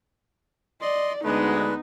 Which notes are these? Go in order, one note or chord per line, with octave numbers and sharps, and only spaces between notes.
D5 D#5 C6
D2 G#3 B3 D4 D#4 B4